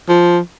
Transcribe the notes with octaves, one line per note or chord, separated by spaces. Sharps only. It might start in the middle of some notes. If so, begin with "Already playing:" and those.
F3